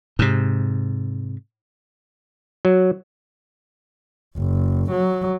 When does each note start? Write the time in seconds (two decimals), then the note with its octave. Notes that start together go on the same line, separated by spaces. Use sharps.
0.19 G#2 C3
2.65 F#3
4.37 F#1
4.91 F#3